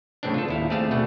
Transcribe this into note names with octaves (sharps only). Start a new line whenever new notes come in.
A2 C#3 E3 C4 D4
F4 A4
D#2 E4 F5
A3 C4 G#4 D5 F5 A5
B2 A3 F#5